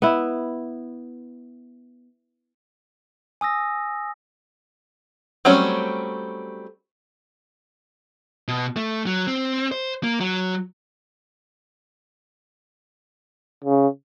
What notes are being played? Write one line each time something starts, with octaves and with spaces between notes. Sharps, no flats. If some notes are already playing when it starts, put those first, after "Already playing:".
B3 E4
G#5 D#6 E6 A#6
F#3 G3 A3 C4 C#4
B2
A3
F#3
C4
C5
A#3
F#3
C#3